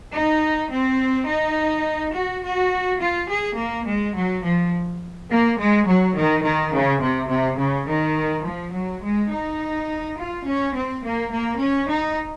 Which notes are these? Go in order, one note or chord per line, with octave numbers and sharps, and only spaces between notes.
D#4
C4
D#4
F#4
F#4
F4
G#4
A#3
G#3
F#3
F3
A#3
G#3
F#3
D#3
D#3
C#3
C3
C3
C#3
D#3
F3
F#3
G#3
D#4
F4
C#4
C4
A#3
A#3
C#4
D#4